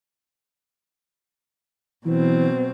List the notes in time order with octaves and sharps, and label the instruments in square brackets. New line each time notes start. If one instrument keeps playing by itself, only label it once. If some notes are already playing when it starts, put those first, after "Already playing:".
[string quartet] B2 F#3 C4 [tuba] E3